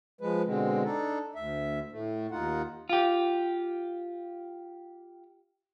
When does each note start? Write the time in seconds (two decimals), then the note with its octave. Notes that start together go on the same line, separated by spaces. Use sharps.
0.21 F3 G#3 B4
0.46 B2 D3 G#3 C4
0.84 D4 D#4 A4
1.35 D2 E5
1.92 A2 A3
2.31 D#2 D#4 F4 F#5
2.89 F4 G4